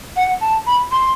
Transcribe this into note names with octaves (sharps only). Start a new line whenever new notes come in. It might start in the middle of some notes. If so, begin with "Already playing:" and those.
F#5
A5
B5
C6